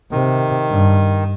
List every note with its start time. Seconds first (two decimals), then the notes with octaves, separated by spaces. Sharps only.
0.12 C3 D#3
0.70 G2